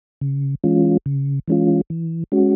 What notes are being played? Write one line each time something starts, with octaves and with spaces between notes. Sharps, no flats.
C#3
E3 G#3 C#4 F4
C#3
E3 G#3 C#4 F4
E3
G#3 C#4 F#4